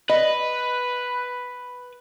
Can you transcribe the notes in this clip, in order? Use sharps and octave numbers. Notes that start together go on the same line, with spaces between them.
B4 D#5